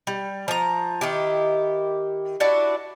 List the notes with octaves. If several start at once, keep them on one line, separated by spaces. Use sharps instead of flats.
G3
F3 A#5
D#3 E4 G4
D4 E4 F#4 D5